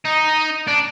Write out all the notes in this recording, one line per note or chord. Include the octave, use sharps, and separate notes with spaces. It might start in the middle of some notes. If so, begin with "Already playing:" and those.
D#4
D4